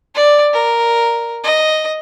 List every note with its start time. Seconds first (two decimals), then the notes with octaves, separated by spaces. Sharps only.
0.15 D5
0.53 A#4
1.44 D#5